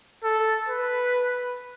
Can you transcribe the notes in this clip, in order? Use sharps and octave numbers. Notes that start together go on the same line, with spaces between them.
A4
B4